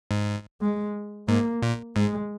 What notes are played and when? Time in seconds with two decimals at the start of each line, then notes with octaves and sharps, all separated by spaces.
0.11 G#2
0.61 G#3
1.28 G#2 A#3
1.62 A#2
1.96 G#2 G#3